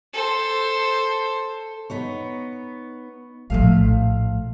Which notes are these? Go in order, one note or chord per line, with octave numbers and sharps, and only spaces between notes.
A4 C5
B3 D#4 C#5
A#1 A2 F3 A3 F5